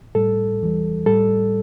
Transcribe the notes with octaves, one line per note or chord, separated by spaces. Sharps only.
A2 G3 A4
E2 E3 G3
A2 G3 A4